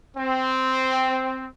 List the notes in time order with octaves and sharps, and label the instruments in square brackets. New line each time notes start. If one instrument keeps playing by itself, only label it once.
[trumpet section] C4